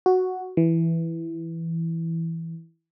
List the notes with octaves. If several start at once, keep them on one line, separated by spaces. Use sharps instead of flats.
F#4
E3